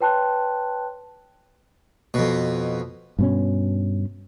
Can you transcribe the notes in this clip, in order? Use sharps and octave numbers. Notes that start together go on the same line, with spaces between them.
B4 C#5 G5 A5 C6 F#6
F2 B2
G2 B2 C#4